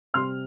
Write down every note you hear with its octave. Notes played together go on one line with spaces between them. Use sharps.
C3 G3 C4 C6 F6